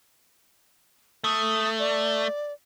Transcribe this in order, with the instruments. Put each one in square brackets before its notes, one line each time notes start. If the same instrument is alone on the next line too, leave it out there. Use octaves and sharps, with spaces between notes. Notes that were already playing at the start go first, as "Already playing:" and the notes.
[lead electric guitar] A3 [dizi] D#6
[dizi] D5